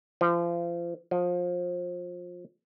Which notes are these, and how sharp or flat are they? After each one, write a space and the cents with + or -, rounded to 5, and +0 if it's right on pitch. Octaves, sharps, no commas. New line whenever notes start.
F3 -30
F3 +25